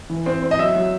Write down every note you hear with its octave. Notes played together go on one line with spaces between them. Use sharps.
E3
C4
C4
D#5
F#3 E5
F#3